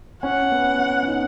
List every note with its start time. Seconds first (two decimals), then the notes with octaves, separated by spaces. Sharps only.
0.23 C#4 F#5
0.52 B3
0.79 C#4
1.03 C#4
1.08 D#4